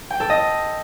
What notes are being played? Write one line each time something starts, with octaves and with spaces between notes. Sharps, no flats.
G5
A4
D#5